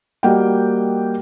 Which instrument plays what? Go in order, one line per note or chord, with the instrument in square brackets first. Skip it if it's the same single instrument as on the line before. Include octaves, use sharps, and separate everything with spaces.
[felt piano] G3 A#3 F#4 D#5 F#5 G5